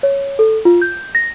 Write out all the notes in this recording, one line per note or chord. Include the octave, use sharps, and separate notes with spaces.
C#5
A4
F4
G6
A#6